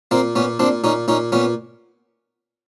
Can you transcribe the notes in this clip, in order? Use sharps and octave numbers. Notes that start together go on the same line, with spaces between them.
A#2 A#3 C4
A#2 B3 C#4
A#2 C4 D4
A#2 C#4 D#4
A#2 C#4 D#4
A#2 B3 C#4